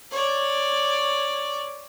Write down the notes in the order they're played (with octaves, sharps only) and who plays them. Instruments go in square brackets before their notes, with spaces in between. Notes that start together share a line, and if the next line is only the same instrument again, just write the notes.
[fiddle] C#5 D5